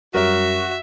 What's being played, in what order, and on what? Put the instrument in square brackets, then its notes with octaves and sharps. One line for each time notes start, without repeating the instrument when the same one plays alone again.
[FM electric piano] F#2 G3 [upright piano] C#4 A#4 [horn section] F#4 [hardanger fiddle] E5